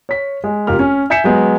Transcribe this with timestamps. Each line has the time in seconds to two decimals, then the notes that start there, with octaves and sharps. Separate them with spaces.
0.09 C#5 B6
0.44 G#3
0.67 F1 F4 G4 A#4 F6
0.79 C#4
1.10 E5 G#5 G6 B6 C#7 E7
1.24 F#3 G#3 B3